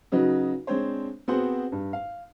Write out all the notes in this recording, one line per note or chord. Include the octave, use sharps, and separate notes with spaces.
C#3 F#3 D#4 F#4 B4
G#3 C4 D4 C5 C#5
B3 C4 F#4 G#4 C5 F#5
G2
F5